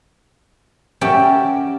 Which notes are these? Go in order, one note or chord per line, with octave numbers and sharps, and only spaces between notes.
F#3 C#4 G4 A#4 D5 E5